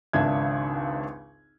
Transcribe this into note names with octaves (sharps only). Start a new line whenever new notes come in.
G#1 C#2 D4 E5 F5 G#6